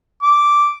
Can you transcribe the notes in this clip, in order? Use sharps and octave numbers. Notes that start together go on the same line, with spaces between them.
D6